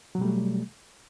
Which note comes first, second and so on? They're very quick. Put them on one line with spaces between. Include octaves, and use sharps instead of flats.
F#3 B2 G3 A3